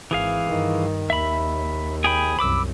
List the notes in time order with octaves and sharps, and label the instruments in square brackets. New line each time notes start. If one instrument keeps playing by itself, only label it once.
[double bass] G#1 [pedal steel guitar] E3 G#4 F5
[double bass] G2 D#3
[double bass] D#2 [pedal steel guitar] E5 B5
[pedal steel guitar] G#4 G5 B5
[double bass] C2 F#2 [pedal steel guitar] B5 D6 E6